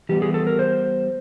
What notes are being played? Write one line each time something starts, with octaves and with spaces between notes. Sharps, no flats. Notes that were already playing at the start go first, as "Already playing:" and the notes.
E3 G3 B3 G4
G#4
A4
A#4
C5